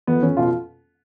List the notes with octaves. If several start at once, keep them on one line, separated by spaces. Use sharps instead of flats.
F2 B3
F2 C#4
B2 F4